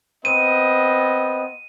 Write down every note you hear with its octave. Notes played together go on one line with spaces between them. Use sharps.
B3 C4 D#5 D#7